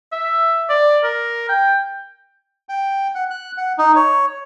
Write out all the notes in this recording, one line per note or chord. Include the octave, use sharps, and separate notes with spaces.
E5
D5
A#4
G5
G5
F#5
F#6
F#5
D#4
C#5